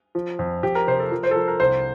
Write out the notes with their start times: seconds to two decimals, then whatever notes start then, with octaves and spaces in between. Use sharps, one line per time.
0.15 F3
0.39 F2
0.63 F2 G4
0.75 A#4
0.87 C3 C5
1.00 A4
1.11 F3 A#4
1.23 C5
1.31 A4
1.36 F3 A#4
1.48 A#4
1.60 C2 C5